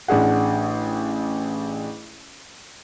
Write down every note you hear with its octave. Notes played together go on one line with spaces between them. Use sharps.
A1 D4 G#4 F#5